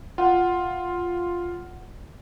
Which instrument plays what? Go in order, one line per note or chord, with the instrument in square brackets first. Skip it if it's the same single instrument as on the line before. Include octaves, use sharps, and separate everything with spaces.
[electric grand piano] F4 [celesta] F#5